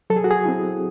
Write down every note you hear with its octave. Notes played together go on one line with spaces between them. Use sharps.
F#3 A4
G#4
F#4
G#4
C4 E4